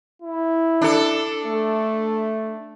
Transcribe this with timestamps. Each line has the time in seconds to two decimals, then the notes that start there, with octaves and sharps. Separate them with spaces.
0.22 E4
0.81 D4 A4
1.46 A3